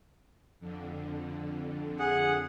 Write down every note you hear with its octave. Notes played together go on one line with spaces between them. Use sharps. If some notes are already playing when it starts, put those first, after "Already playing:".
F2 D3
G#4 F#5